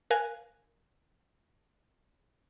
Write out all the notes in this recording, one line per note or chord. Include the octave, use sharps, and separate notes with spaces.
A#4 F5 G#5 F#6